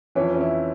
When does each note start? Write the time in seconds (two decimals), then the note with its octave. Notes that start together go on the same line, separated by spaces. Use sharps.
0.15 F2 E3 C#4
0.34 C#4
0.41 E4